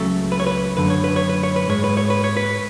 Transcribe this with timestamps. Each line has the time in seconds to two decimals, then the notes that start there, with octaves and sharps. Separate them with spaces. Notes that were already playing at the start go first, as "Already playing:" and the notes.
Already playing: C#2 C#3 F#3 A3 A4
0.32 B4
0.40 C#5
0.47 B4
0.77 F#2 D3 A3 B4
0.90 C#5
1.04 B4
1.16 C#5
1.30 B4
1.43 C#5
1.56 B4
1.68 G#2 G#3 C#5
1.84 B4
1.97 C#5
2.10 B4
2.24 C#5
2.37 B4